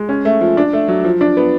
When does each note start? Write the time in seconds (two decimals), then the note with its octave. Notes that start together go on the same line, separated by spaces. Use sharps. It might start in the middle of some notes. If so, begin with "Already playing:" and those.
Already playing: G#3
0.09 C#4
0.25 A3
0.41 F3
0.57 D4
0.73 A3
0.88 F#3
1.04 F3
1.21 D4
1.37 B3